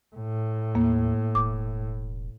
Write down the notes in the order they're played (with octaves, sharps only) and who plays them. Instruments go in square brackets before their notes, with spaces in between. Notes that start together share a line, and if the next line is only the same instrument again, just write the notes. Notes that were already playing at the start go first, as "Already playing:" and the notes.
[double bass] A2
[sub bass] D#2 [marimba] A#3
[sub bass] E1 [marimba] D6